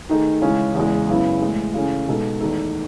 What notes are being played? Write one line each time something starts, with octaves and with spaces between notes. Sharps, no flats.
D#3 A3 D#4 G#4
C#3 E3 G#3 C#4
E2 C#3 E3 G#3
F#2 C#3 E3 B3 E4
A2 E3 G#3
C#3 E3 A3 C#4 G#4
B2 G#3 D#4 A4
E2 D#3 A3 D#4 A4